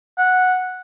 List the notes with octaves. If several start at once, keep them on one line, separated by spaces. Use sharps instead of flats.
F#5